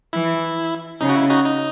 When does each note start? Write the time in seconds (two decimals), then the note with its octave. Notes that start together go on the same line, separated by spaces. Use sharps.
0.13 E3 E4
1.01 C#3 D#4
1.09 F#4
1.15 E4
1.30 D#4 F#4
1.45 D#4